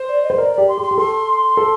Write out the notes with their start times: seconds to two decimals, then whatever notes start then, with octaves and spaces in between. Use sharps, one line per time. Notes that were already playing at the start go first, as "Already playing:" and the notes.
Already playing: C5
0.08 D5
0.22 D#5
0.30 C5
0.38 A#4 D5
0.52 D5
0.58 G4
0.68 C6
0.78 G4
0.82 C6
0.91 G4
0.98 A4 C6
1.57 A4